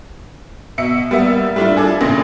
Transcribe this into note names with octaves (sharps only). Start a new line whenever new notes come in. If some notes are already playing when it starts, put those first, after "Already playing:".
B2 E5 C#7
G3 A#3 B3 E5
G3 A3 D4 E4 F4
G#4 A4 D5 G#5
A1 A#2 C#3 A#6